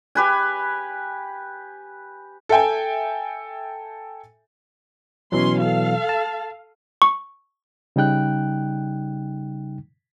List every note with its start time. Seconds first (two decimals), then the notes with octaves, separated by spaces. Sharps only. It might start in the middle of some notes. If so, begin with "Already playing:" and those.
0.15 G4 B4 G#5
2.49 A4 E5 G5 G#5
5.32 B2 E3 F#3 C#4 C6
5.61 A4 F5
6.09 A5
7.02 C#6
7.96 C#3 G3 D#4 G5 F#6